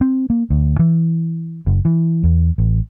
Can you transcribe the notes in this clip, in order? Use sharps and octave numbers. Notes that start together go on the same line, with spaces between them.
C4
A#3
D2
E3
F#1
E3
E2
A1